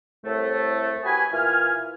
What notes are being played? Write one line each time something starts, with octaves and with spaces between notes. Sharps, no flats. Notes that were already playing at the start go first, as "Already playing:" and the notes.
C2 A2 A3
F#4 G4 B4 G#5
A#2 E3 G#5 F6